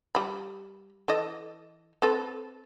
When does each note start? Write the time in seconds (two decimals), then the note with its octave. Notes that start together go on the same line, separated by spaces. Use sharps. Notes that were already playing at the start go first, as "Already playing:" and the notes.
0.15 G3 B5
1.08 E3 A4 D#5
2.02 C4 A4 B4